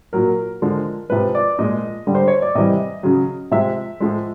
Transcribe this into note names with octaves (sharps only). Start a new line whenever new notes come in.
A#2 F#3 A#4
D3 F3 G#3
C3 F3 G#3 B4
D5
A#2 F3 G#3 D#5
D3 G3
C5
C#5
D5
C3 E3 G3 D#5
C#3 F#3
C3 F3 G#3 E5
A2 F3 G#3